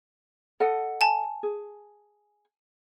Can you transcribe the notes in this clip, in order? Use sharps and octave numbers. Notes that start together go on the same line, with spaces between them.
A4 D#5 F#5
G#5 A5
G#4